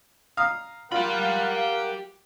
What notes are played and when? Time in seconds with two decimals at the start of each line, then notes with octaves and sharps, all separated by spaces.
0.37 F5 A#5 D#6
0.92 F4 G4 A#4 F5 F#5 B5